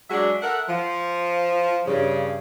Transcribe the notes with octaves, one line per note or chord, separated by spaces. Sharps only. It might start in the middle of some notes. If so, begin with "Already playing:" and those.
F#3 G#3 D4 F#4 E5
A4 A#4 E5 F#5
F3
G2 C#3